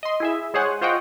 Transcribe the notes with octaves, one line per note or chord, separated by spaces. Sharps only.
D#5 C6
E4 G#4 E5
G#3 G#4 C5 C#5 F#5 G#5
F4 C5 C#5 D#5 F#5 G5